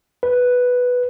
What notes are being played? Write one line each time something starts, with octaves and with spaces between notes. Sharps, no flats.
B4